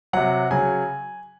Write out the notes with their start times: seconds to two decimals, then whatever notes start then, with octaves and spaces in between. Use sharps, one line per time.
0.13 C3 F#3 F#5
0.51 C#3 F#3 G#5